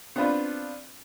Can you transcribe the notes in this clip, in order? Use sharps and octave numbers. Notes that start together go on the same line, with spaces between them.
B3 C4 D4 F4 B4